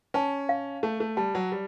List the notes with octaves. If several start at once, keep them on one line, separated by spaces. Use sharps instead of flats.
C#4 A5
F5
A3 A5
A3
G3 A5
F#3
G3